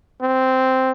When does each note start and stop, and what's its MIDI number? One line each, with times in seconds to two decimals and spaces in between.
0.22 0.91 60